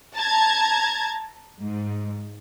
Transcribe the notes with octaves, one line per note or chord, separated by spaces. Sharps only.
A5 A#5 G#6
G#2